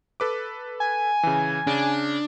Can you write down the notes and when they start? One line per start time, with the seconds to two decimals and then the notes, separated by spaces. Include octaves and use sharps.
0.20 A4 B4 D6
0.80 G#5
1.23 C#3 E3
1.67 C#3 D4